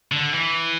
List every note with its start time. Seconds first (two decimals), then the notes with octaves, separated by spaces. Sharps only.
0.12 D3
0.34 E3